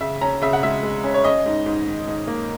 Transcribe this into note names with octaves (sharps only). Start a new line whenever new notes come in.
C#3 E5
C#4 A#5
C#3 E5
F#5
G#3 E5
G#3
C#4
C#5
C#4 D#5
G#2
G#2
D#3
G#2
A#3